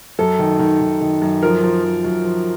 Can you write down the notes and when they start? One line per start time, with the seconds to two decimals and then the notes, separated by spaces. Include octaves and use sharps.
0.19 F#2 A4
0.39 D#3
0.59 D#3
0.81 D#3
1.01 D#3
1.22 F#2
1.43 F3 A#4
1.63 F3
1.84 F3
2.04 F#2
2.24 F3